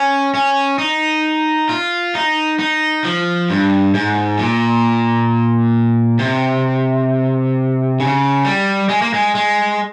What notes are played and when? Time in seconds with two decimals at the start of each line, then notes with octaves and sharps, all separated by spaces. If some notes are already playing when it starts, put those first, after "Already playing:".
Already playing: C#4
0.34 C#4
0.79 D#4
1.69 F4
2.15 D#4
2.59 D#4
3.04 F3
3.50 G2
3.94 G#2
4.39 A#2
6.19 C3
8.00 C#3
8.45 G3
8.89 G#3
9.02 A#3
9.14 G#3
9.35 G#3